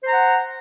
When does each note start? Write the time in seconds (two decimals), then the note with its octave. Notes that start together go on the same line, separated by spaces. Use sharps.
0.03 C5
0.07 A#5
0.11 F#5